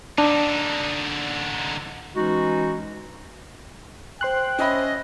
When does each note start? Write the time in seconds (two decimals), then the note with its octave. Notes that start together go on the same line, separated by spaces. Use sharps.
0.18 D3 D4 D#4
2.16 E3 G#3 C#4 D#4 F#4
4.21 C5 G5 C6 F#6
4.59 C#4 D#5 E5 B5